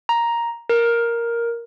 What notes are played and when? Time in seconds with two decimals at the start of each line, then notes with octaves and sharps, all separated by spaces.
0.09 A#5
0.69 A#4